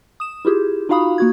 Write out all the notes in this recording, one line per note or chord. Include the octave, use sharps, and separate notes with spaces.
D#6 E7
E4 F4 G4 G#4
D#4 F4 F#4 F5 B5 D#6
A#3 F#4 G#6